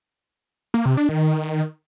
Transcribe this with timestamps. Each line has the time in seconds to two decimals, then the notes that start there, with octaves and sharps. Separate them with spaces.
0.74 A#3
0.86 C3
0.97 D4
1.09 D#3